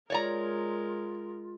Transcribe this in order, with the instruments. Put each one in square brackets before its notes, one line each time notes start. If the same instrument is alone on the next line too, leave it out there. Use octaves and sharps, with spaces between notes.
[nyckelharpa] G#3 A#4 [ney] F4 [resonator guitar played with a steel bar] C#5 D5 A#5